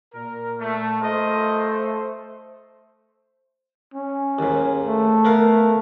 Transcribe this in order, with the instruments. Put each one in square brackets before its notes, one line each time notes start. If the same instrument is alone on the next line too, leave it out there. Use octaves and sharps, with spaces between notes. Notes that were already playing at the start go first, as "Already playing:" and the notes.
[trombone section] A#2 [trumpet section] A#4
[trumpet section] A3
[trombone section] A3 C5 [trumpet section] F4 A#4 D#5
[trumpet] C#4
[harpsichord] D#2 G#2
[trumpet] A3
[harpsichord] B3 A#4 F5